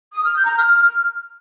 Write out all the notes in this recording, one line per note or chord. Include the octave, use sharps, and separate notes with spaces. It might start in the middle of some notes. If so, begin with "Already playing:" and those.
D#6
F6
G6
A#5
F6